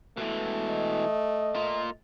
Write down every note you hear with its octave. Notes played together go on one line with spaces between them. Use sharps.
B2 E3 A3
D#5
A#3 F4